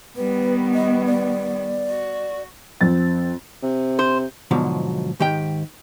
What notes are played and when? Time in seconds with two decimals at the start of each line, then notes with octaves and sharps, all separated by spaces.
0.17 D#3 G3 B3 B4
0.74 D#5
1.06 D5
1.90 F#4
2.81 F2 C4 A6
3.63 C3
3.99 C5
4.51 G#2 B2 D3 F3 F#3
5.20 G#2 D#3 G4 G5